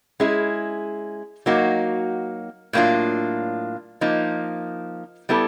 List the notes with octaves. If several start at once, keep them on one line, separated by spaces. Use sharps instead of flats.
G#3 C#4 E4 G#4
F#3 A#3 D#4 F#4
A2 F#3 A#3 D4 F4
F3 A#3 D#4
G3 B3 E4 A4